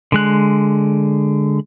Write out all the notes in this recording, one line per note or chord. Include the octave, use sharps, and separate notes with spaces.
D3 G#3 F#6